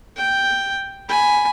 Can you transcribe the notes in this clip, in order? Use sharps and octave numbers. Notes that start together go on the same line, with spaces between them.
G5
G#5 B5